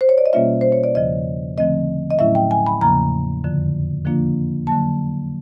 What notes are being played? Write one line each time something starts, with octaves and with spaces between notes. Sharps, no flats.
C5
C#5
D5
D#5
B2 G3 A#3 C#4 F4 E5
C5
C#5
D5
E2 C#3 F3 D#5
D3 F3 A3 C4 D#5
D#5
A2 F#3 A3 C#4 E4 E5
G5
G#5
B5
E2 C#3 F3 A#3 A#5
F2 D3 F3
D3 F3 A#3 D4 F4
D3 F#3 A#3 A5